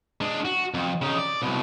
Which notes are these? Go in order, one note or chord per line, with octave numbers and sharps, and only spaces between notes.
G#3 D4
F#4
F2
C#3 D#4
D5
C2 B2